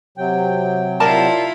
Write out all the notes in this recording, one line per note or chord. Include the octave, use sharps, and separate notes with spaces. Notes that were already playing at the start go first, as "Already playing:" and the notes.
C3 F#3 G5
E4 F4 A#4 D5 A5